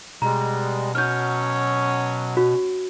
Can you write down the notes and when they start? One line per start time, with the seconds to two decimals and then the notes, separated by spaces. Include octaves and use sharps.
0.22 B2 G3 G#3 A#5
0.95 F#3 C#4 F6 G6
2.37 F#4